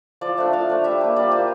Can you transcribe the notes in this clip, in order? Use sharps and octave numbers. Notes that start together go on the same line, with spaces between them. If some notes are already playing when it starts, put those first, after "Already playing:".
F3 D5
A3 D4 E5
F3 F5
A3 D4
G3 E5
A#3 F4
G3 D5
A#3 F4 C5